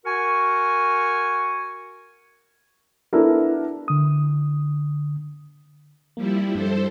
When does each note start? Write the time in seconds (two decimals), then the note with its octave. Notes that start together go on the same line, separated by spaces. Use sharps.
0.05 F#4 A#4 G#5 C#6
3.13 B3 D4 E4 A4 A#4
3.88 D3 D#6
6.17 F3 G3 A#3 E4
6.55 G2 A4 C5